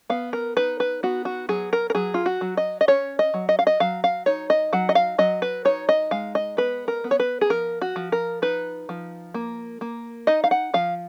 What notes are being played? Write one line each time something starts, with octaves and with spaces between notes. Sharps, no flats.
B3 F5
A#4
D#4 B4
B4
B3 F#4
F#4
F#3 G#4
A#4
A#4
F#3 G#4
F4
F#4
F#3
D#5
D#5
C#4 C#5
D#5
F#3
D#5
F5
D#5
F#3 F5
F5
D#4 C#5
D#5
F#3 F#5
D#5
F5
F#3 D#5
B4
D#4 C#5
D#5
G#3 F5
D#5
B3 B4
A#4
B3
C#5
B4
G#4
F3 A#4
F#4
F3
A#4
D#4 B4
F3
A#3
A#3
D#4 D#5
F5
F#5
F3 F5